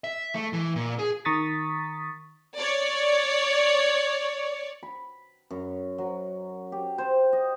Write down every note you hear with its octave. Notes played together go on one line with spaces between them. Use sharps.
E5
A3
E3
A#2
G#4
D#3 A#5 C#6 D#6 A6 B6
C#5 D5
B5
F#2
F#3
G4
C5
D#5